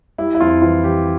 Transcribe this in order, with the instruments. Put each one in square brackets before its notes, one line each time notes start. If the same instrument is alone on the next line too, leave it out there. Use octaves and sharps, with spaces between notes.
[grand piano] G3 E4
E4
F2 F4
E3 F4
E3 G4